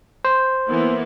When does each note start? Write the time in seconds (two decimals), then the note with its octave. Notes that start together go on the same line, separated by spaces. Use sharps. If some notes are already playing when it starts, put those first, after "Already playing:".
0.25 C5
0.68 E3 A#3 B3